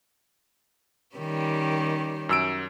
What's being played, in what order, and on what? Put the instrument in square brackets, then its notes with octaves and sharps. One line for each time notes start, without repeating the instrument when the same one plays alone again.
[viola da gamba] D#3 G3 C#4
[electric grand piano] F#2 E6 D7